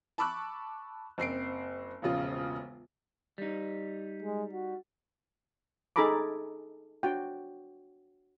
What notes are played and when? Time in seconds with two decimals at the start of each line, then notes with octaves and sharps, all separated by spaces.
0.18 A5 B5 C#6 D6 E6 F#6
1.18 F#1 C4 C7 D7
2.02 E1 A#1 C#3 F4
3.38 G3 D#4
4.23 G#3
4.53 F#4
5.96 D#4 G#4 A4 A#5 B5 D6
7.03 D4 F#4 G5